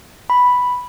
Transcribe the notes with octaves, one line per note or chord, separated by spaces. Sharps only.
B5